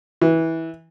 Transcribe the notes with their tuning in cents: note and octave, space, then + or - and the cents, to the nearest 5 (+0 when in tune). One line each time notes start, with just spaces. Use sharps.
E3 -20